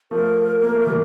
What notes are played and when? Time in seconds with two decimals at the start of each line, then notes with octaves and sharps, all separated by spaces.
0.11 F3 A3 A#4
0.62 A#3
0.74 A3
0.87 E3 G3